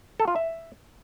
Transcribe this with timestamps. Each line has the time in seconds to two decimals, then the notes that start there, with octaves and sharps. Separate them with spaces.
0.20 A4
0.28 F4
0.36 E5